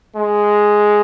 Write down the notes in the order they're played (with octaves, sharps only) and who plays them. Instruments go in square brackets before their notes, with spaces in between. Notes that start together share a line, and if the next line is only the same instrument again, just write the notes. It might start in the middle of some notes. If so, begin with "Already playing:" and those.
[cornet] G#3